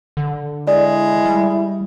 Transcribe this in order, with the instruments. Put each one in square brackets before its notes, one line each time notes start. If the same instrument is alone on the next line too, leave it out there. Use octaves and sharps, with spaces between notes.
[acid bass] D3
[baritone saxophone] G#3 [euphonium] E4 [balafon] D5
[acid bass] G3